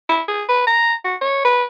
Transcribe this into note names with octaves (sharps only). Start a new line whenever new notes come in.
E4
G#4
B4
A#5
F#4
C#5
B4